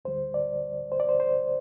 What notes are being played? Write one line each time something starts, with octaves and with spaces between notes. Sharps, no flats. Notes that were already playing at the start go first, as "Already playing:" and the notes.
D2 D3 G3 C5
D5
C5
D5
C5
C5